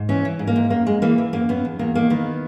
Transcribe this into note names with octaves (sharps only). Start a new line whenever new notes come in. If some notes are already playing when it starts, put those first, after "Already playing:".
Already playing: G#2
E3 C#4
E3
G#2
A#3
G#2
F#2 A#3
F#2 G#3
E3 A#3
E3
F#2 A#3
F#2 B3
E2
E2 A#3
D#3 A#3
D#3 B3